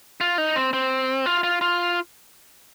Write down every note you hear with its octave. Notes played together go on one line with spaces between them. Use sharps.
F4
D#4
C4
C4
F4
F4
F4